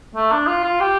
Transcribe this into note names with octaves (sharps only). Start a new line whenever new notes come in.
A3
D4
F4
F4
G4